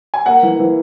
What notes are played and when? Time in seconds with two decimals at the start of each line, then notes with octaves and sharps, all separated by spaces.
0.14 G#5
0.26 A#3 F#5
0.43 E3
0.59 E3